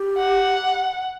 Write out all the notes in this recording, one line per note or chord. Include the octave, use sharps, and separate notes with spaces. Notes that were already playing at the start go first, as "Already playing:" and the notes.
Already playing: G4
F#5